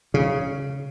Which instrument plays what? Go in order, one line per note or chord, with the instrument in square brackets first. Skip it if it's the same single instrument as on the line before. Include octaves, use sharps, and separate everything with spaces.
[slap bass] C#3